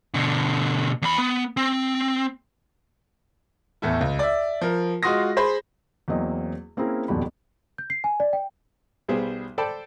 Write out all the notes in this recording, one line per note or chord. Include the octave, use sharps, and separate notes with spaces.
B2 D3
E2 B5
B3
C4
E2 A2 A3 E4
C#2
D5 E5
F3 A#4
G#3 F4 F#4 C6 D#6 A#6
G#4 C5 B5
E2 F#3 A#3 C4 D#5
A#3 C4 C#4 E4 G#4 A#4
D#1 G#1 F2 B2 G3 B5
G6
C7
G#5
D5
G5
B1 G3 B3 G#4 C5
A4 C5 D5 G5 A5 B5